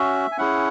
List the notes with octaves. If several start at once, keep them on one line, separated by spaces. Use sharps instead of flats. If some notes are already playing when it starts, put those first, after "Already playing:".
Already playing: C#4 F#4 E5
G#5
C#4 E4 G#4 F#5